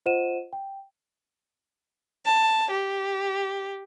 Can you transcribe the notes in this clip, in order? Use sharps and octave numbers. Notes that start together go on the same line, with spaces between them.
F4 C5 D#5 F#5 D#7 E7
G5
A5
G4